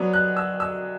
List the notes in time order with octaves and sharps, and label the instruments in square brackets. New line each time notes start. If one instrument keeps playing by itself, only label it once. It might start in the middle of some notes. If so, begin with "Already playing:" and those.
Already playing: [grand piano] F#3 B3 D4
F#6
E6
E6